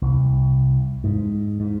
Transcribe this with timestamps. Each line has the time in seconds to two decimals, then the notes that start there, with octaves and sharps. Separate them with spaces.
0.02 C2
1.04 G#2
1.60 G#2